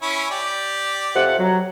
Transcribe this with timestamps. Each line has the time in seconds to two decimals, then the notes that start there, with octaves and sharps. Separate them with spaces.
0.02 C#4 E4 C#5
0.31 G4 D5
1.15 F2 C3 F#5
1.40 F#3